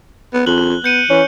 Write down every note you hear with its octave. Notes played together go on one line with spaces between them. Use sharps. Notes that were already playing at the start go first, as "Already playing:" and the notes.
B3
F2 F#6 F#7 G7
B3 G6 C#7 D#7
E3 C#4